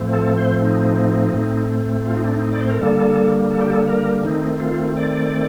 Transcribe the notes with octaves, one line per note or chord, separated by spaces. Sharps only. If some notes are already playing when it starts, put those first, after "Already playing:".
Already playing: A2 F3 A3 C4
A4
C5
D#4
A2 A3 C4
F4
D#4
D4
D#4
D5
C5
A#4
D3 G3 A#3 A4
A4
G4
A4
A#4
D#3 A3 C4 D#4
F4
D5